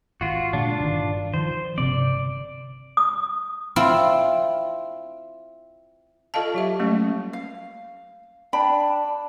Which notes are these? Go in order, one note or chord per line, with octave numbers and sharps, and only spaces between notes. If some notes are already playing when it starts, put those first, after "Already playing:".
G#1 F4 F#4
A#2 D3 G#3 D4 F4
G1 D#3
D#3 F3 C5
G1 C3 C4 D5
D#6
C4 E4 F4
F4 A4 D#5 F5 A5
F#3 G4 E5
F#3 G3 A3 A#3 C#4
F5
D4 G5 B5